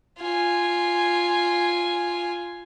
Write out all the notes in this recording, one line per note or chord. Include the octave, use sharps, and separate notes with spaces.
F4 G#5